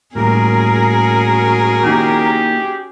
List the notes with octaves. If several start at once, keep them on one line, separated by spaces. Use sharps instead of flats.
A2 G3 A#3 C#4 F#4 G#4 A#4
A#3 D#4 E4 G4